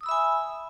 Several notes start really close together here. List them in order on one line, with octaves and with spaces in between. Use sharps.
D#6 E6 B5 E5 G#5